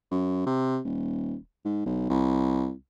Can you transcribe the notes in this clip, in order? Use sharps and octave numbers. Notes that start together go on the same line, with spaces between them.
F#2
C3
D#1
G#2
B1
C2